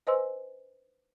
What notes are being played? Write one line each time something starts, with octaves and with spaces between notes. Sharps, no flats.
B4 C5 D#5 G#5 C6 E6